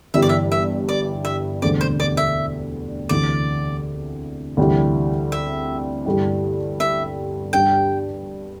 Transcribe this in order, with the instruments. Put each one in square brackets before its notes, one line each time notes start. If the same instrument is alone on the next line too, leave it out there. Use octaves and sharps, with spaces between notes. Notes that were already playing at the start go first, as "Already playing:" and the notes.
[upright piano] G1 G2 E3 G3 [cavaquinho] E5
[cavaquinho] D5
E5
E5
D5
E5
[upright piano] E1 D2 D3 G3 C4 [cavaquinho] D5
[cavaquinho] C5
D5
E5
[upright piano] D2 C3 E3 [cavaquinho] D5
[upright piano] D2 C3 E3 G3 E4
[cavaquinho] E5
[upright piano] G2 D3 G3 E4
[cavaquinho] E5
[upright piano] G2 G3 D4 G4 [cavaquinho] G5